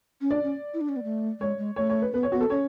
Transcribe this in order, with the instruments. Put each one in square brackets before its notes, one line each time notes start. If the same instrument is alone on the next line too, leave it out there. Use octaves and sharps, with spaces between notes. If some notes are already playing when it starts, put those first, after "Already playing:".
[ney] C#4
[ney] D4 [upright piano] D5
[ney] C#4
E4
D4
C#4
B3
A3
[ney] G#3 [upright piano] C#5
[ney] G#3
[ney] A3 [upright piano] C#5
[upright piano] C#5
B4
[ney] B3 [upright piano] B4
[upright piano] C#5
[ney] B3 [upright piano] F#4
[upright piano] A4
[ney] C#4 [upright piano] C#5